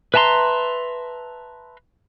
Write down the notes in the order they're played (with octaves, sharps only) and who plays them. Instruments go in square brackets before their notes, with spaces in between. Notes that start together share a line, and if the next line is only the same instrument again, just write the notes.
[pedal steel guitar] B4 E5 A5 A#5 C6